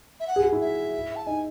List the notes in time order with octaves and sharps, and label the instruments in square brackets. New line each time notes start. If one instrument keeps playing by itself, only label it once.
[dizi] E5
F#5
[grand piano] G#4
F#4
E4
[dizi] E5
A5
[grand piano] D#4 [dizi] G#5